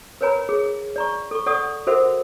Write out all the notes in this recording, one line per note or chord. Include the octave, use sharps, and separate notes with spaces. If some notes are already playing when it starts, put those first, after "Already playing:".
A#4 B4 C#5 G#5 A#5 B5
G#4
D5 A#5 C#6
A4 C#6
A4 D5 F#5 C#6 D#6
F#4 A4 A#4 C5 E5 F#5